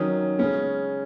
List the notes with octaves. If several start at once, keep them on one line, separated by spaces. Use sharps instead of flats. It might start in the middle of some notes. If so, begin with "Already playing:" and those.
Already playing: D#3 F#3 C#4 D#6
C#3 G#3 C#4